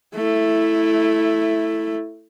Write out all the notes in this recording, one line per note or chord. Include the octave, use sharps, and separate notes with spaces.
A3 E4